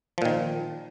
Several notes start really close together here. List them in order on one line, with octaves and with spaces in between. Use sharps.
F3 A#2 D#3